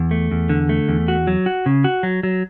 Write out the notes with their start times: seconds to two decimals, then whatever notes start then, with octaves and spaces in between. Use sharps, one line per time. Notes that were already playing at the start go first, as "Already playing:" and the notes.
Already playing: E2
0.11 A3
0.31 E2
0.49 D3
0.69 A3
0.88 E2
1.08 F#4
1.27 F#3
1.46 F#4
1.66 C#3
1.84 F#4
2.03 F#3
2.23 F#3